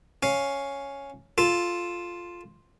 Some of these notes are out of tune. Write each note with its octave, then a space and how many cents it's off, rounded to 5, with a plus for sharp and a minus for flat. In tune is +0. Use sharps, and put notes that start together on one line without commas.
C#4 +0 F5 +0
F4 +0 A4 +0